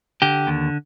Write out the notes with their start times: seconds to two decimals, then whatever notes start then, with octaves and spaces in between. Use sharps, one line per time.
0.22 D3 G4
0.47 D#2